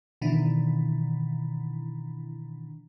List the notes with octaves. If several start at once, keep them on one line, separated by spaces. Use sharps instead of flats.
B2 D#3 E3 D4 E4